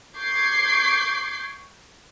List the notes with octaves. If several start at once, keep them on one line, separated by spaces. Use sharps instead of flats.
C#6 D6 G6 G#6 C7